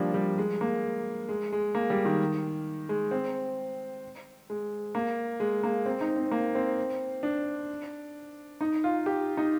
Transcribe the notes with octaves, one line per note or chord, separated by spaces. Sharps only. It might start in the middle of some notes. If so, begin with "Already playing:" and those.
Already playing: F3 G3 A#3 D4
G3
G#3
A#3
G#3
G#3
A#3
G3
D#3
G#3
C4
G#3
A#3
G#3
A#3
C4
D#4
C4
A#3
C4
D4
D#4
F4
G4
D#4